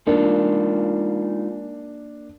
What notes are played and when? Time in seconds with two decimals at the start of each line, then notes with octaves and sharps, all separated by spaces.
0.07 G#3 A#3 D4 D#4 F4